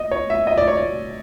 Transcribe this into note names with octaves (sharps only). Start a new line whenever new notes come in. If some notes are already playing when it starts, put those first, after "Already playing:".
Already playing: D#5
C#5
E5
D#5
D5
C#5
D5